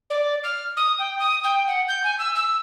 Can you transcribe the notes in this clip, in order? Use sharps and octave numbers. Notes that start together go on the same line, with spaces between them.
D5
F6
D#6
G5
D#6
G5
F#5
G6
G#5
E6
E6